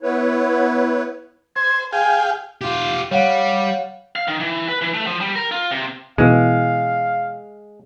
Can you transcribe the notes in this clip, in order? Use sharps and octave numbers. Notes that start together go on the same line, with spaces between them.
B3 E4 B4 C#5
C5 G#6
G#4 F5 G5 G#5
F4 G4
G3 C#5 F5 F#5
F5
D#3
E3
B4
E3
A3
F3
G3
A#4
F4
C3
B2 E3 G#3 F5